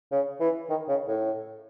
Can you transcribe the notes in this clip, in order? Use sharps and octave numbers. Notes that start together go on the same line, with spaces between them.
C#3
E3
D#3
C#3
A2